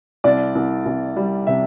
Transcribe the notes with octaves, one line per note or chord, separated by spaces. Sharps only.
C2 D5
C2
C2
G3
C3 E5